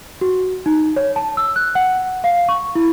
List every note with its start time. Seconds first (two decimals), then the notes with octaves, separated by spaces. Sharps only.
0.21 F#4
0.66 D#4
0.96 C#5
1.16 A5
1.37 E6
1.56 F#6
1.75 F#5
2.24 F5
2.49 C#6
2.75 E4